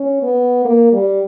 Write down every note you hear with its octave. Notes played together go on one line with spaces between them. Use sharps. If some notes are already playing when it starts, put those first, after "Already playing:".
Already playing: C#4
B3
A#3
G3